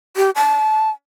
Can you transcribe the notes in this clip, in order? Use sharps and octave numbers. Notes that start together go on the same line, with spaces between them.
G4
A5